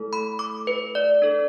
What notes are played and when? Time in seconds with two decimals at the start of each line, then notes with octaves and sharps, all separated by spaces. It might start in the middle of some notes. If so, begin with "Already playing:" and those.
Already playing: A3 E4 A4
0.13 B5
0.39 D6
0.67 B4
0.95 D5
1.22 D4 A4